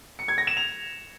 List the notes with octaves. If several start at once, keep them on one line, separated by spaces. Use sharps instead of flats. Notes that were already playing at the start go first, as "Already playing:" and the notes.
C#7
G#6
A#6
E7
F7